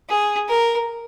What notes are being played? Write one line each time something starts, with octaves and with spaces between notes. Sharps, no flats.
G#4
A#4